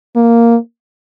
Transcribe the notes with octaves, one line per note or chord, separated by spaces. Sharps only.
A#3